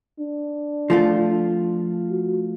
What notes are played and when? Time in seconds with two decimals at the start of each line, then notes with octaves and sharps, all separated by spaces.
0.20 D4
0.90 F3 A3 F4
2.10 F#4